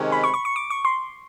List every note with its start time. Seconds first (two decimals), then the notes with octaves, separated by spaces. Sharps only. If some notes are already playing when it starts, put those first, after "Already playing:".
Already playing: C3 D#3 G#3 C#4
0.12 B5
0.24 C#6
0.34 C#6
0.45 C#6
0.56 D6
0.70 C#6
0.85 C6